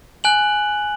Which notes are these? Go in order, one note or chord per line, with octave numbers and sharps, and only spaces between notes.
G#5 F#6 F#7